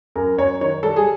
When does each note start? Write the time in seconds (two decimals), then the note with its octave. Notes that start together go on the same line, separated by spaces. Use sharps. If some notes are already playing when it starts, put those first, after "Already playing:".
0.15 F#2 A#4
0.37 F#2 C#5
0.61 D#3 C#5
0.83 G3 A4
0.96 G#4